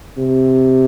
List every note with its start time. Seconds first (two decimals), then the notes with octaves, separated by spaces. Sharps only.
0.17 C3